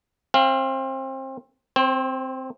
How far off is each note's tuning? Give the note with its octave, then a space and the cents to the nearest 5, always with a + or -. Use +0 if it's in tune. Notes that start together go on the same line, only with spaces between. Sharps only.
C4 +30 F5 -10
C4 +0 C5 +40